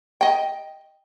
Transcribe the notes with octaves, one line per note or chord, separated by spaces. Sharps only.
D#5 G5